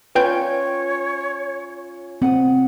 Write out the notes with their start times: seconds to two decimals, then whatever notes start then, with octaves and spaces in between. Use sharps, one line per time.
0.15 C#4 F4 B4 C#5 G5 G6
2.22 C4 F#5 D#6